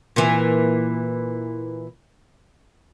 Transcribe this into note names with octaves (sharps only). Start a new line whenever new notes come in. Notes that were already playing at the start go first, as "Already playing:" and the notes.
A#2 E3